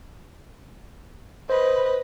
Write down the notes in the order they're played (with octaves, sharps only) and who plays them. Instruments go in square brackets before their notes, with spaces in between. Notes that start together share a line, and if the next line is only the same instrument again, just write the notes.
[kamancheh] B4 D#5 [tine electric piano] C5